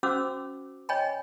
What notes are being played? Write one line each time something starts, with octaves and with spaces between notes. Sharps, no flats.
C#4 F#4 C5 F#5 D6 E6
C#5 D#5 G5 G#5 B5